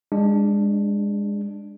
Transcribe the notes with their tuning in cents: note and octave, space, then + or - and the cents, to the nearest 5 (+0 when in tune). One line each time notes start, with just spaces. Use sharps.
G#3 -25 D4 +0